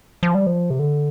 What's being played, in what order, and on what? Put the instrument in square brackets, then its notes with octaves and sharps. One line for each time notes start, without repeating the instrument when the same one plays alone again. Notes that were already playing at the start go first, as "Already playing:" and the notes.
[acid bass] F3
G3
F3
C3
D3